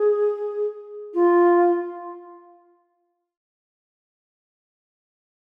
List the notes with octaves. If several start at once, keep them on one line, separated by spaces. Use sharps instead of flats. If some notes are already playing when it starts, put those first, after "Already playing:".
Already playing: G#4
F4